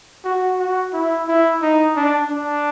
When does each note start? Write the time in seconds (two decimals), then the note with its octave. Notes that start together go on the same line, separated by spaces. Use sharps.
0.25 F#4
0.60 F#4
0.93 E4
1.28 E4
1.62 D#4
1.96 D4
2.30 D4